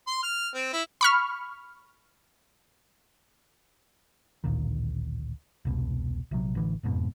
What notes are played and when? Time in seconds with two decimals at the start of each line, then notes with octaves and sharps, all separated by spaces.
0.07 C6
0.23 F6
0.54 C4
0.73 E4
1.01 B5 C#6 F6
4.44 A1 D2 A#2 D#3
5.65 E1 C2 B2
6.31 A#1 C3 F#3
6.55 A1 D3 E3
6.83 E1 F2 G#2 B2